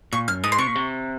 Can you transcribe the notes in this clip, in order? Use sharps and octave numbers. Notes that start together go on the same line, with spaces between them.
A#2 C#6
F#2 F6
G#2 D#6
C6
C3 C#6
A#2
C3